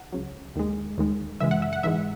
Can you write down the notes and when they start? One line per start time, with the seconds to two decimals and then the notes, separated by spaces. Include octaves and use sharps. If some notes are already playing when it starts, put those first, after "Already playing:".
Already playing: F#5
0.12 C#2 C#3 F#3
0.56 D#2 D#3 G#3
0.98 D#2 D#3 G#3
1.40 F#2 C#3 E3 G#3 E5
1.51 F#5
1.62 E5
1.73 F#5
1.83 G#2 E3 G#3 E5